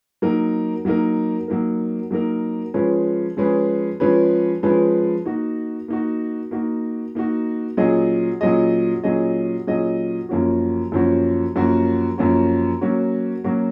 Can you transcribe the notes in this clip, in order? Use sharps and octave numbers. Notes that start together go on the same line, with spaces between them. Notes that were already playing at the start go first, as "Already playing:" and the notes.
F#3 A#3 D#4 A#4
F#3 A#3 D#4 A#4
F#3 A#3 D#4 A#4
F#3 A#3 D#4 A#4
F3 G#3 C#4 G#4 B4
F3 G#3 C#4 G#4 B4
F3 G#3 C#4 G#4 B4
F3 G#3 C#4 G#4 B4
A#3 D#4 F#4
A#3 D#4 F#4
A#3 D#4 F#4
A#3 D#4 F#4
A#2 F#3 C#4 G#4 D#5
A#2 F#3 C#4 G#4 D#5
A#2 F#3 C#4 G#4 D#5
A#2 F#3 C#4 G#4 D#5
F#2 F3 A#3 C#4 F#4
F#2 F3 A#3 C#4 F#4
F#2 F3 A#3 C#4 F#4
F#2 F3 A#3 C#4 F#4
F#3 A#3 C#4 F#4
F#3 A#3 C#4 F#4